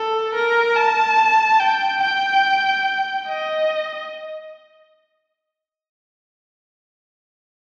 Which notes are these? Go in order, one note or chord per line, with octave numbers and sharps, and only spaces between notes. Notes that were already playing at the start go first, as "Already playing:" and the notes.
Already playing: A4
A#4
A5
G5
G5
D#5